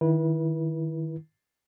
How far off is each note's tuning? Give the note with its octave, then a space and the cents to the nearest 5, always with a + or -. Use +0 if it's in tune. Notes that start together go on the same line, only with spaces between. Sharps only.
D#3 +0 E4 +0 B4 -30